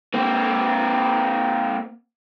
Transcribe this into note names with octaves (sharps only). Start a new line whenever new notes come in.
A#3 C4